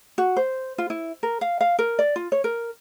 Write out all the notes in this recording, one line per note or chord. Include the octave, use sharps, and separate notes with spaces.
F#4
C5
F4
E4
A#4
F5
F5
A#4
D5
F4
C#5
A#4